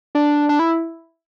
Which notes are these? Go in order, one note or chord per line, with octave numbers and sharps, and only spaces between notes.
D4
D4
E4